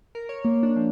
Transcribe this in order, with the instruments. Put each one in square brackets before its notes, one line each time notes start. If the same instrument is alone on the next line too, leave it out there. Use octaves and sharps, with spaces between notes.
[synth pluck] A#4
C#5
A#3
D4
F3